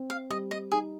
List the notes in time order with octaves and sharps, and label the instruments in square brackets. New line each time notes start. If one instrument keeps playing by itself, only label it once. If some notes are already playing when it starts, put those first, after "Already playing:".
Already playing: [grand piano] C4
[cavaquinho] F5
[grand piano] G3 [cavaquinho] D#5
[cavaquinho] D#5
[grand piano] D#4 [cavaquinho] G#4